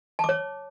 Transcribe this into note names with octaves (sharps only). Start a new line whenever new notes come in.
C#5 A5 D6